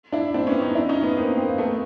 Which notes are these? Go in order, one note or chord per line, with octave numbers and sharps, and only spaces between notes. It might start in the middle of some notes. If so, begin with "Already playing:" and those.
D4 E4
C4 D4
B3 C#4
C#4 D#4
D4 E4
C#4 D#4
B3 C#4
A#3 C4
A#3 C4
A#3
A3 B3